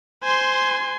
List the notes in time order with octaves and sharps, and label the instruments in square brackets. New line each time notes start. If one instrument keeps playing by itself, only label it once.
[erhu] C5 [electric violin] G#5 C6